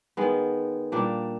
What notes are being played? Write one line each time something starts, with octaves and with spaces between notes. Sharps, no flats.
D#3 G#3 B3
A#2 G3 A#3 D4